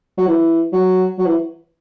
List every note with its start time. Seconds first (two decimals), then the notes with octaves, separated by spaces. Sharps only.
0.18 F#3
0.27 E3
0.73 F#3
1.19 F#3
1.26 E3